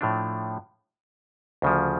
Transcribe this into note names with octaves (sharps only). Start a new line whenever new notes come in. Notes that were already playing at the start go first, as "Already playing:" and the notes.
A2 F3 A3 D4
D2 C#3 F3